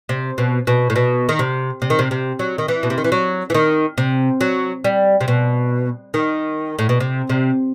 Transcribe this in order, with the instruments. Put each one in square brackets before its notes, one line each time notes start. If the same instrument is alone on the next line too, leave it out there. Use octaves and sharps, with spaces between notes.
[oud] C3
B2
B2
A2
B2
D#3
C3
C3
D#3
C3
C3
F#3
D#3
E3
B2
C3
D#3
E3
F#3
E3
D#3
C3
F#3
G3
C3
B2
D#3
A2
B2
C3
C3